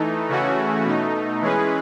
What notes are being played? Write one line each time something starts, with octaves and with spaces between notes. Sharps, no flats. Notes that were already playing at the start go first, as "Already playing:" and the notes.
Already playing: E3 A3 D#4
C#3 E3 A3 C#4 F#4
B2 A3 D#4
E3 G#3 C#4 G#4 B4